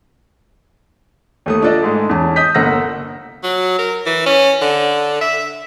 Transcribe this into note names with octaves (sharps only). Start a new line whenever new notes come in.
D#2 A3 D#6
D4 F4 A4 D5 D#5
G#2 G#3 A3
E2 C#4 A5
D#5 D#6 G6 B6
G1 A#3 F#5 E6 A#6
F#3
A#4
E3
C#4
D3
E5